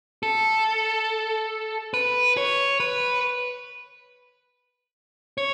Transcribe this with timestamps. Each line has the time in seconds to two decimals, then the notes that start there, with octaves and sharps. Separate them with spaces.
0.23 A4
1.94 B4
2.37 C#5
2.80 B4
5.38 C#5